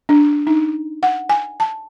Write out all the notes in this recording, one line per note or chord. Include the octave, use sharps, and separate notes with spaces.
D4
D#4
F#5
G#5
A5